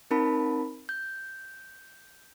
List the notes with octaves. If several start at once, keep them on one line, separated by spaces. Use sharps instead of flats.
C4 D#4 A#4 A5 B5
G6